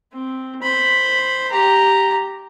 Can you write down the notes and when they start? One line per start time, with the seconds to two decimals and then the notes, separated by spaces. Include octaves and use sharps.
0.12 C4
0.62 C5 B5
1.51 G4 A#5